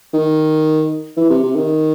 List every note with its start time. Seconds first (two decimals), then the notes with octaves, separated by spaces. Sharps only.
0.13 D#3
1.17 E3
1.30 C3
1.43 C3
1.55 D#3